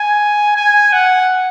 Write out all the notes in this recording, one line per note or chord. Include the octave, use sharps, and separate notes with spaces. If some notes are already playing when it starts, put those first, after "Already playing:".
Already playing: G#5
G#5
F#5